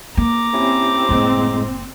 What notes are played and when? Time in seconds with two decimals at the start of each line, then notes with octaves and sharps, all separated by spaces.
0.17 A#3 A#5 D6
0.53 C4 C#4 E4 G4
1.09 F#1 A2 G#3 A#3